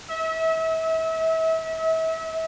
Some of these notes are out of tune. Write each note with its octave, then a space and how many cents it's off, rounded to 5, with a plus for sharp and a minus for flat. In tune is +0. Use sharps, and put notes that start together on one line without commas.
E5 -35